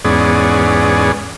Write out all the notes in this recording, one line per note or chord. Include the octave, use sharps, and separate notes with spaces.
E2 G#2 B3 C#4 G#4 D5